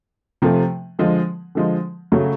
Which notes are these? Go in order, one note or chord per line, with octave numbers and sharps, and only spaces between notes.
C3 F3 A3
D3 F3 G#3
D3 F3 G#3
C#3 F#3 A3